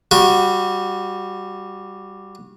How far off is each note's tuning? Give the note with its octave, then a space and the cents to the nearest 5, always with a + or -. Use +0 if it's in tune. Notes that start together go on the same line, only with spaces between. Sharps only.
G3 +0 F#4 -20